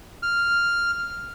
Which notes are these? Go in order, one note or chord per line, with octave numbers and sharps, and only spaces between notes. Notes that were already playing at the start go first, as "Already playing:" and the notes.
F6